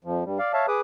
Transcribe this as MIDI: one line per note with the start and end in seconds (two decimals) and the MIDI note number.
0.04 0.24 41
0.04 0.24 53
0.24 0.38 43
0.24 0.38 55
0.39 0.53 74
0.39 0.53 77
0.54 0.66 73
0.54 0.66 76
0.54 0.66 77
0.54 0.66 81
0.68 0.81 68
0.68 0.81 71
0.68 0.81 83
0.68 0.81 86
0.68 0.81 87
0.68 0.81 90